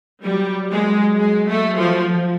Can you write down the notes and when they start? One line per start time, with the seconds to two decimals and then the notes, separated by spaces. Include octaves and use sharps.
0.25 F#3 G3
0.71 G#3
1.17 G#3
1.48 A3
1.78 F3
2.08 F3